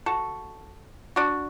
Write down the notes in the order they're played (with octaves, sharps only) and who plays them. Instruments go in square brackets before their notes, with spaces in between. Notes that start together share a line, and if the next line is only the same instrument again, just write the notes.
[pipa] F#4 A4
D4 F#4